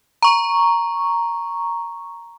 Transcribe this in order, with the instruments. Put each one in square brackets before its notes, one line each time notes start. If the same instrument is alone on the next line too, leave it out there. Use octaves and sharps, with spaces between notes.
[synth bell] A#5 C#6